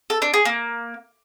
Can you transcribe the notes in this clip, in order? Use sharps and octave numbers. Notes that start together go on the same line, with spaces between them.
A4
D4
G#4
A#3